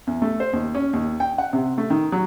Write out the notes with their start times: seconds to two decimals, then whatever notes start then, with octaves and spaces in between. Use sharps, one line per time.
0.07 E2
0.22 A3
0.40 C5
0.53 D#2
0.75 C#4
0.93 D#2
1.20 G5
1.38 F#5
1.53 C3
1.78 A3
1.90 D#3
2.12 F#3